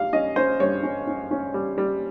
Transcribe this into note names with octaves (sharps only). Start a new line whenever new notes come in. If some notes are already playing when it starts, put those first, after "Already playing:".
Already playing: G3 F5
C#4 D#5
C#4 C5
G2 C#5
C#4
C#4
C#4
G3
G3